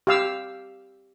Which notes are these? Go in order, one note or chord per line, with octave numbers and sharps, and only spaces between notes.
G4 F5 E6